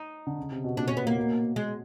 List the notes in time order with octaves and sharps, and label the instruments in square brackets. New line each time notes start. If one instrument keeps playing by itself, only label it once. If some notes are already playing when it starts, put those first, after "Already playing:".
Already playing: [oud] D#4
[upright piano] D3
C#3
C3
B2
[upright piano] A#2 [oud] D4
[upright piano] A#2 [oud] C#4
[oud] B3
[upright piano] A#2
[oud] A#3
[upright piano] B2
[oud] G#3